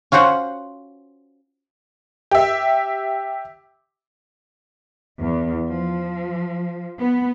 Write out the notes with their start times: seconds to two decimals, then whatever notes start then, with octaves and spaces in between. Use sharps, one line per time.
0.12 C#4 F4 F#4 C5 F#5
2.31 G4 E5
5.20 E2
5.69 F3
6.98 B3